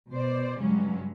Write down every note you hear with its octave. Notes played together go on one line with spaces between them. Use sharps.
B2 C5 D5
G2 C#3 F#3 G#3 C#4